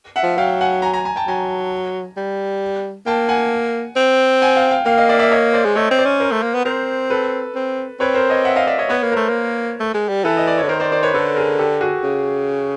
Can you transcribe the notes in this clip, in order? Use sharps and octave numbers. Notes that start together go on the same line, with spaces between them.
E5 F#5
F3
F#3 F5 G5
F#5 G#5
G#5 A#5
G#5 A#5
G#5 A#5
G5 A5
F#3 G#5 A#5
G3
A#3 G5 A5
F#5 G#5
C4
F#5 G#5
F5 G5
F5 G5
A#3 F5 G5
D#5 F5
D5 E5
D5 E5
C#5 D#5
C5 D5
G#3
A3 C#5 D#5
C4
C5 D5
C#4
A#4 C5
A3
A#3
B3
C4 A#4 C5
A4 B4
C4
C4 B4 C#5
A#4 C5
C#5 D#5
E5 F#5
D#5 F5
D5 E5
C#5 D#5
B3 B4 C#5
A#3
A3 A#4 C5
A#3
A3
G#3
G3
E3 A4 B4
D#5
D5
D3 C#5
D#3 A#4 C5
C5 D5
C5 D5
B4 C#5
D3 A4 B4
G#4 A#4
G4 A4
F#4 G#4
C#3